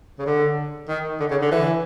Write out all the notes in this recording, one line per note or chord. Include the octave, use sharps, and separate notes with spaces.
C#3
D3
D#3
D3
C#3
D3
E3